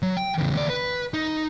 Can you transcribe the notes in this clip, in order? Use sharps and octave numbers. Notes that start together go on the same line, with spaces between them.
F#3
G5
E2 C#3
D#2 D5
B4
D#4